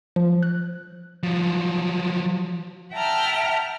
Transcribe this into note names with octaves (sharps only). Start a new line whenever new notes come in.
F3
F#6
F3 F#3
E5 F#5 G5 A5 A#5 F6